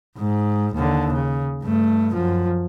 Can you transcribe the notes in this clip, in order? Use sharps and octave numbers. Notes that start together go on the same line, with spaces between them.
G#2
D#2 D3
C#3
G2 A3
F#2 F3